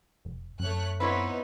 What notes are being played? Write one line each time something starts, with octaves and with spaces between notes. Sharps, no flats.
F1
F#2 A3 C#5 F#6
B3 C4 D#4 E4 B4 C#5